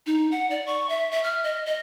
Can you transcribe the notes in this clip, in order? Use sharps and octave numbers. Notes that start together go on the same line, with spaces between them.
D#4
F#5
D5
C#6
E5
E5
F6
D#5
D#5